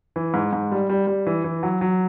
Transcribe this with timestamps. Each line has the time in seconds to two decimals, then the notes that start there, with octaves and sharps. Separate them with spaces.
0.16 E3
0.34 G#2
0.53 G#2
0.72 G3
0.90 G3
1.07 G3
1.26 E3
1.44 E3
1.63 F#3
1.81 F#3